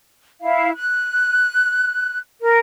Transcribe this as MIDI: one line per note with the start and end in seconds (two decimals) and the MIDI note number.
0.41 0.70 64
0.41 0.70 77
0.73 2.17 90
2.41 2.58 70